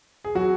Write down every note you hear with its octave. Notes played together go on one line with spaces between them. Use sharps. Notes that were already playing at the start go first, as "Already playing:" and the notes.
G#4
F#3 F#4